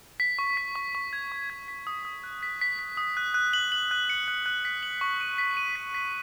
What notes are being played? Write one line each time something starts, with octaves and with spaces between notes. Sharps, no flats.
B6
C#6
B6
C#6
C#6
G#6
C#6
G#6
B6
D#6
D#6
F#6
B6
B6
B6
D#6
F#6
F#6
F#7
F#7
F#6
C#7
F#6
F#6
B6
F#7
C#6
D#7
B6
D#7
B6
B6